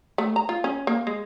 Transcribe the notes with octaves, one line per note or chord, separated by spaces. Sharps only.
A3
A#5
F4
C#4
A#3
G#3